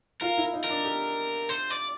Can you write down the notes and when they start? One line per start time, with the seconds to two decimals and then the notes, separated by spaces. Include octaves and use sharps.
0.21 F4 A#4
0.38 E4
0.53 D#4
0.64 A#4
0.70 D4
0.85 G4
1.49 C5
1.70 D5